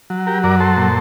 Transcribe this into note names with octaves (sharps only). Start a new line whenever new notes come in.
F#3
G4 A#4
F#2 A#4 D5
A4 C5
A#2